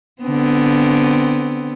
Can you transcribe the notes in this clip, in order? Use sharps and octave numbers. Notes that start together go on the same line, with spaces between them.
D3 B3 C4